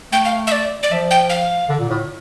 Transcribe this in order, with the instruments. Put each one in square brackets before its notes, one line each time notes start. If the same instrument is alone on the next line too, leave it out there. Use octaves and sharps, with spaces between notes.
[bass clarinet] A3 [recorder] G5
[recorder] F5
E5
D5
D5
[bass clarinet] F3 [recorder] E5
[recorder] G5
F5
[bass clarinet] D3
A#2
A2